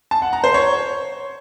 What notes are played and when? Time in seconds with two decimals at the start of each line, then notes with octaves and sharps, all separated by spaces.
0.11 A5
0.22 F#5
0.33 A#5
0.44 C5
0.54 C#5